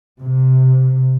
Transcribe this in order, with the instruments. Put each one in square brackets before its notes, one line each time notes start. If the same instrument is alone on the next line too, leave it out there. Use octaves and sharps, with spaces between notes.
[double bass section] C3